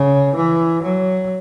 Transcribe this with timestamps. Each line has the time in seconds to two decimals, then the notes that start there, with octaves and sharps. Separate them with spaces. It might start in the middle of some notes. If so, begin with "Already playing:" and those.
Already playing: C#3
0.35 E3
0.83 F#3